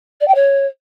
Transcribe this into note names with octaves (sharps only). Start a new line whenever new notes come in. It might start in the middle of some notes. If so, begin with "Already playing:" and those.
D5
G5
C#5